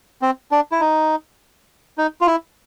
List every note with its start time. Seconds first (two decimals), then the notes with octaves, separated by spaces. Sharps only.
0.22 C4
0.51 D4
0.72 E4
0.80 D#4
1.98 D#4
2.21 F4
2.27 E4